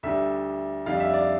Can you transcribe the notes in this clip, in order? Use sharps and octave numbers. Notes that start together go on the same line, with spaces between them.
D2 D3 G3 E5
F2 D3 G3 F5
E5
D5